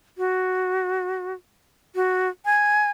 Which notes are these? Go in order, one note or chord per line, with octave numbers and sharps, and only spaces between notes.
F#4
F#4
G#5